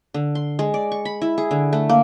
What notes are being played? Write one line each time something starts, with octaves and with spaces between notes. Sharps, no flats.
D3
C6
G#3
D5
C#6
B5
E4
G#4
D3
A3
A#3